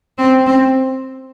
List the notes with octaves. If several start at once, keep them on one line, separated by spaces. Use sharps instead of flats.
C4
C4